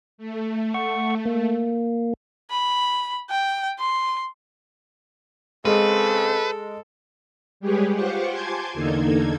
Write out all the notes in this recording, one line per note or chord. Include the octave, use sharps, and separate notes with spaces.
A3
F#5 C#6
A#3
B5
G5
C6
C#3 G#3 C4 A4 B4
G3 G#3 G4 G#4 B4 C#5
F4 G4 C5 F#5 C#6 D6
G#5 A5 C6 D6 G6 G#6
E2 D3 A#3 D#4 A4 G#6